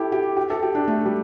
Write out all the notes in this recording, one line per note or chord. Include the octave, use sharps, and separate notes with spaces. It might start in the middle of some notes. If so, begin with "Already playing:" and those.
Already playing: E4 G4 A4
G4
G4
A4
G4
D4
A3
G3